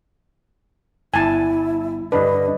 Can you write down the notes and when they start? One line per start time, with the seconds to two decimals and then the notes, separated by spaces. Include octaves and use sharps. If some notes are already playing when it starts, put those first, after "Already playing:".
1.14 G1 E4 G#5 A5
2.12 G2 D3 D4 B4 D#5